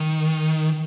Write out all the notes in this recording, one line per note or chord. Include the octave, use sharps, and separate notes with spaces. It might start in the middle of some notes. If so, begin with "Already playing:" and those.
Already playing: D#3